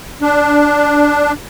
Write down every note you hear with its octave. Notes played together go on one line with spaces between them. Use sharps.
D4